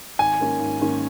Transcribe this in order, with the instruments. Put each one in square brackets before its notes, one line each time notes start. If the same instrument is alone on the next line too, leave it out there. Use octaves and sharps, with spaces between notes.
[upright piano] G#1 [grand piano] G#5
[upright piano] G#2 D#3 A#3 C#4
G#1
G#2 D#3 A#3 C#4